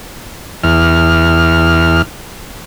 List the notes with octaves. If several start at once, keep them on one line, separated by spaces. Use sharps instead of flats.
E2 F6